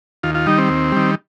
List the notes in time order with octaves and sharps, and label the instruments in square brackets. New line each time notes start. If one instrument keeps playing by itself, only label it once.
[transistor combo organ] D#2 F4
F4
D#3 G3 D#4
C4
D#2
D#3 G3